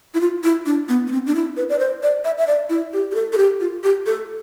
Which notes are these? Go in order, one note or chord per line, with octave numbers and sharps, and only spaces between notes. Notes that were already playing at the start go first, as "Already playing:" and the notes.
E4
F4
E4
D4
B3
B3
C4
D4
E4
B4
D5
C5
D5
E5
E5
D5
E4
G4
G4
A4
A4
G4
F4
G4
A4